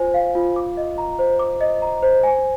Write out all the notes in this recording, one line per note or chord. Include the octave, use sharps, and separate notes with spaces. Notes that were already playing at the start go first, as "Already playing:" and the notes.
Already playing: F4 C5 G#5
F5
F4
D6
D#5
A#5
C5
D6
D#5
A#5
C5
G#5